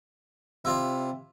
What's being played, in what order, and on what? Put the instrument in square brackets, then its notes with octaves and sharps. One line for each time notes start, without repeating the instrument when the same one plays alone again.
[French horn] C3 [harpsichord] E4 F4 D5